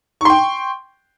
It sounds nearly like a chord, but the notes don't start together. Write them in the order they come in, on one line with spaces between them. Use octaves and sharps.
C#6 C6 G5